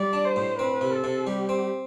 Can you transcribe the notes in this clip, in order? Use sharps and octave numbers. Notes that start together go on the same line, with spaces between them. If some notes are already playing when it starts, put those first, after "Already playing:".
Already playing: G3 D5
D4
C5
A2
C4 B4
C3
A4
C3
G3 G4
C4